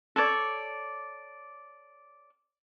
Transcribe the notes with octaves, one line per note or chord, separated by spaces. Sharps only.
A4 C#5 D5